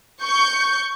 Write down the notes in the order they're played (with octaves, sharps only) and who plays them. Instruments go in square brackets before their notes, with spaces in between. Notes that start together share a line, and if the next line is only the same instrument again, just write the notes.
[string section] C#6 G6